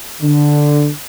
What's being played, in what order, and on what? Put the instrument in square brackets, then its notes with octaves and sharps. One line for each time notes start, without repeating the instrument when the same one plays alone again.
[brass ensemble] D3